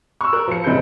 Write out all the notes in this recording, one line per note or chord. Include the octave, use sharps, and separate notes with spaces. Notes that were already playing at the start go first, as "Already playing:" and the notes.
C#6 E6
A#4 F#6
F3 C#7
F#1 C4 E4 G6 C#7